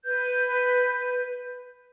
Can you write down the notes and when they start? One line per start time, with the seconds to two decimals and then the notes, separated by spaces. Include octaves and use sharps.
0.05 B4 G6